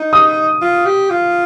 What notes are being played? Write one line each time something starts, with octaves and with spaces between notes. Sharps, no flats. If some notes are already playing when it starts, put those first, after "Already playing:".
Already playing: D#4
D#6
F4
G4
F4